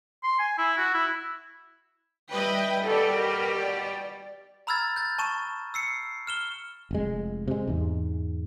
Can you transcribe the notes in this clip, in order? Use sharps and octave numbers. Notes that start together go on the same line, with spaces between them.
C6
G#5
E4
F#4
E4
G3 B4 D#5 E5 G5
B2 G3 G4 A4
A#4
D5
A#5 B5 E6 F6 G#6 A6
G6 A6
A5 C#6 E7
E6 C7 C#7
F6 E7 G7
F1 G#3
C3 G#3
E2 G#2